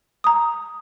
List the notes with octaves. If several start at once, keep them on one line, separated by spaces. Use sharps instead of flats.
A#5 D#6